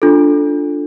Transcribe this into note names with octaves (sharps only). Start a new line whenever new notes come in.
D4 F4 A4